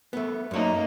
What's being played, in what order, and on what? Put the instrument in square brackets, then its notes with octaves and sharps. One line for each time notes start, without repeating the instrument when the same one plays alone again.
[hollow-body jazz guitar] A3 B3
[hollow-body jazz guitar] F#2 C#5 [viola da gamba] A3 A#3 D#4